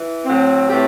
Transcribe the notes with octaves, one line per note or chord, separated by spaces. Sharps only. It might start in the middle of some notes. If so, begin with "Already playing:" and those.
Already playing: E3
A2 F#3 C4
A2 E3 A3 C4 G4